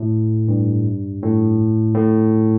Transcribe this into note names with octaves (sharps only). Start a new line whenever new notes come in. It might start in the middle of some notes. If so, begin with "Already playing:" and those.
Already playing: A2
G2
A2
A2